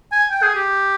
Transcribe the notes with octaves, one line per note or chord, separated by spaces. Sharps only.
G#5
G5
G#4
G4